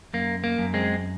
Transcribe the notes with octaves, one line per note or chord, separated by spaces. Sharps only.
F#2 A#3
A#3
F#2
G#3 C4